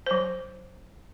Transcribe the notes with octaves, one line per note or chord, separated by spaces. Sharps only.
F#3 C5